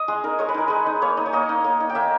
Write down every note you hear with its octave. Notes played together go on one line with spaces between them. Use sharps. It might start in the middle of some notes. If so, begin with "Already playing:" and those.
Already playing: D#5
G#3 G#4
D#4 A#4
G#3 C#5
B4
D#4 A#4
G#3 B4
D#4
A#3 C#5
D#4
C#5
A#3 D#5
D#4
A#3
D#4
G5
A#3 E5